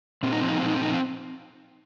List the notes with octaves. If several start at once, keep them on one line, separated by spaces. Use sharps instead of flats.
A#2 C4
D#4
F3 C4
D#4
C4
A#2 D#4
C4
F3 D#4
C4